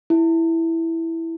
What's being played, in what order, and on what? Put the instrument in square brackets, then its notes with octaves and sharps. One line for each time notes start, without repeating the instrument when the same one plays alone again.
[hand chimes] E4